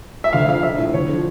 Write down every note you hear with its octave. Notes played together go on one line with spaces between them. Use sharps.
E5
D2 F5
D3 F3 F5
A#1 E5
A2 F3
D2 C#5
D3 F3